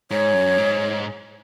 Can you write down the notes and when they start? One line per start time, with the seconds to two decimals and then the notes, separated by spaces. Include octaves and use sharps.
0.11 G#2 C#5
0.34 F#2
0.58 G#2